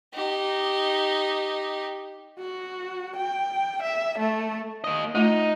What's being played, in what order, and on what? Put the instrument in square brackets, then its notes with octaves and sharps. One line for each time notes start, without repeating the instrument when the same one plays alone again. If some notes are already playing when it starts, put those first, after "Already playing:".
[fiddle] D#4 G4
[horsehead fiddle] F#4
G5
E5
A3
[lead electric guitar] A#3 D#5
[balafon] A3 F4 E5 [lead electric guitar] D#4